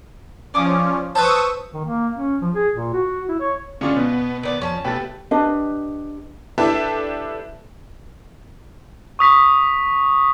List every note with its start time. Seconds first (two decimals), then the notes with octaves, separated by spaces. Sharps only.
0.54 F3 C#4 D5 D6 D#6
1.15 B4 C5 A5 C#6 D#6 E6
1.74 D#3
1.85 A#3
2.15 C#4
2.41 F3
2.54 G#4
2.74 A#2
2.94 F#4
3.28 E4
3.40 C#5
3.81 D3 G#3 C#4 F4 C#5 D5
3.96 B2 B3
4.43 D#3 B3 D5
4.61 F2 C#4 A5
4.85 B2 A3 G4 B4 A6
5.31 D4 G4 B4 D#5
6.58 D4 E4 G4 A4 B4 E5
9.19 C#6 D#6 B6